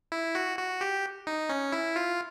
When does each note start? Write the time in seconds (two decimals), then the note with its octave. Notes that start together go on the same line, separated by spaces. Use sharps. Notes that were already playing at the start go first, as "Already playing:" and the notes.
0.12 E4
0.35 F#4
0.58 F#4
0.81 G4
1.27 D#4
1.49 C#4
1.72 E4
1.96 F4